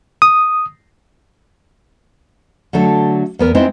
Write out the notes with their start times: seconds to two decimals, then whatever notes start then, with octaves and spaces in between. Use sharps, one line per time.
0.22 D#6
2.73 D3 F#3 A3 A4
3.39 E2 B3 A#4
3.55 G#3 B3 C4 D#4 E4